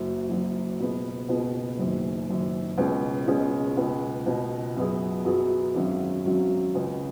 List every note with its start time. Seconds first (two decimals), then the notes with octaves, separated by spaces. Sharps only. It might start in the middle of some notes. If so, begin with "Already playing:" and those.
Already playing: F#1 F#2 F#3
0.29 F#1 F#2 F#3
0.80 C#2 B2 B3 G#4
1.29 C#2 B2 B3 G#4
1.78 F#1 F#2 D#3
2.29 F#1 F#2 D#3
2.78 C#2 B2 G#3 C#4 G#4
3.27 C#2 B2 G#3 C#4 G#4
3.77 C#2 B2 B3
4.26 C#2 B2 B3
4.77 F#2 F#3 B3 G#4
5.25 F#2 F#3 B3 G#4
5.75 G#1 F#2 F#3 C#4
6.25 G#1 F#2 F#3 C#4
6.75 C#2 C#3 G#3 C#4 G#4